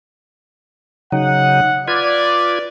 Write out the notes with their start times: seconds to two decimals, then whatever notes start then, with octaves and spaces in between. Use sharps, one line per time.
1.12 C#3 F#3 D#4 F#5
1.88 F4 B4 D5 G#6